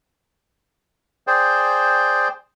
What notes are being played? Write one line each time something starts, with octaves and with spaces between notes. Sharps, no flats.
G#4 C5 D5 G5